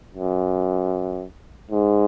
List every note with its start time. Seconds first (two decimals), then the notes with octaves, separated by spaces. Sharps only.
0.14 F#2
1.71 G#2